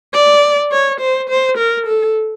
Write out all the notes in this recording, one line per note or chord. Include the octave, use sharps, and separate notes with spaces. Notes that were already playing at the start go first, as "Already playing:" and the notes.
D5
C#5
C5
C5
A#4
A4